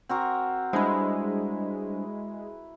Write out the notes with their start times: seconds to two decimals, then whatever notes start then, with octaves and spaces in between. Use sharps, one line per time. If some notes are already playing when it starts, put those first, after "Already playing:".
0.09 C4 F#4 A#4
0.73 G3 G#3 D4 E4 B4 C5